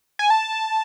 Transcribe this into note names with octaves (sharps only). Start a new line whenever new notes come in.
G#5
A5